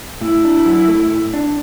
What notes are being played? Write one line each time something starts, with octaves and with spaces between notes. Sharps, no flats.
A2 E4
D4
F#3
A3
A2
D4